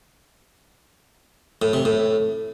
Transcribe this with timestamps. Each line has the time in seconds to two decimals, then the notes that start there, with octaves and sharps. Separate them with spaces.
1.62 A2
1.73 C3
1.85 A2